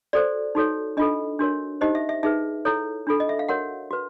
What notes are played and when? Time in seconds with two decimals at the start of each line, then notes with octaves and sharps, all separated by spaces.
0.13 F#4 A4 C5 D5
0.55 D#4 F#4 A4 C#5
0.97 D4 F4 A4 D#5
1.39 D4 F#4 A#4 C#5
1.81 D#4 G4 C5 D#5
1.95 E5
2.09 E5
2.23 D#4 G#4 B4 E5
2.65 E4 A4 C#5
3.07 D4 F4 A4
3.20 D#5
3.29 E5
3.39 F5
3.49 F#4 A#4 C#5 F#5
3.91 F#4 B4